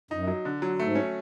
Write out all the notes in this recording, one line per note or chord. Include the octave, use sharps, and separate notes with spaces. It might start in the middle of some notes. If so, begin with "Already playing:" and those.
F#2 D#4
F#3
D3
F#3
G#2 A3
C#4